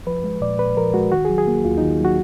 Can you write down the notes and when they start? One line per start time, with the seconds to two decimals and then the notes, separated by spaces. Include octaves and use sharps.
0.07 F3 B4
0.24 G#3
0.41 A#2 D5
0.59 A#2 B4
0.77 F3 A#4
0.94 G#3 F#4
1.12 D#3 F#4
1.25 G#4
1.30 F#3
1.38 G#4
1.47 A#3
1.65 D#2 F4
1.78 D#3 D#4
2.00 F#3 F#4